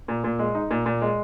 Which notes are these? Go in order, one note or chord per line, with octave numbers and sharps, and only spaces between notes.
A#2
A#2
G#3
D#4
A#2
A#2
G#3